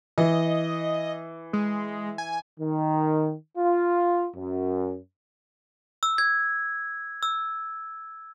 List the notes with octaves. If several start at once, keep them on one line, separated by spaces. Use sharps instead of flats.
E3 D#5
G#3
G#5
D#3
F4
F#2
E6
G#6
E6